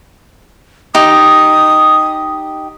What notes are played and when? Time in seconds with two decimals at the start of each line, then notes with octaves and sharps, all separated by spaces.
0.95 D#4 G4 D#6